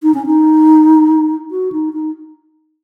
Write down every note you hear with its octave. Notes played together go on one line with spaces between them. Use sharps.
D#4
C#4
D#4
F#4
D#4
D#4